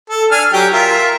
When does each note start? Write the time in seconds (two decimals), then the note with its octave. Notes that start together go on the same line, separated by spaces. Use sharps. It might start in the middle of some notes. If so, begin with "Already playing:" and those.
0.10 A4
0.31 D4 G#5 F6
0.53 F#3 G4 G5
0.72 F4 A#4 E5